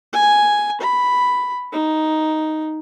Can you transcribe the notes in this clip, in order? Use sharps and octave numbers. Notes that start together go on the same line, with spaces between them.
G#5
B5
D#4